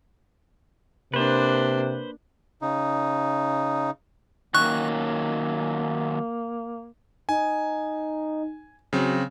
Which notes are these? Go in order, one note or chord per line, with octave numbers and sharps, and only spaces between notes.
C3 A#3 D4 B4 C5
C#3 D#4
D#3 F#3 A#3 C#4 C#6 F#6
D#4 G#5
C#3 F#3 C4